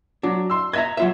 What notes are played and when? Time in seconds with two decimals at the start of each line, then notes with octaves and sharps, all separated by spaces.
0.23 F#3 D4
0.50 C6 E6
0.73 D#5 E5 A#5 G#6
0.97 F#3 F4 E5